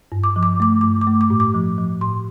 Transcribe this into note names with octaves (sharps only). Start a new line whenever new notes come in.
G2
D6
F3
D6
A3 D6
G2 D6
D6
A3
D6
A2
D6
F3
F3
A2 C6